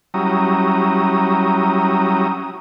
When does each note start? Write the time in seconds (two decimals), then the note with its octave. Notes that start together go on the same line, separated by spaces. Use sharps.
0.14 F#3 G3 C#4 E4 A#5 D#6